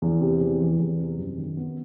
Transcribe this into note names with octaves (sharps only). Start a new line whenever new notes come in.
E2
C3
E2
E3
E2
C3
F#2
D#3
B3